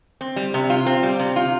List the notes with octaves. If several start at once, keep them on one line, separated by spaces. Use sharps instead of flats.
C4
G3
C3
F4
C4
G3
C3
F4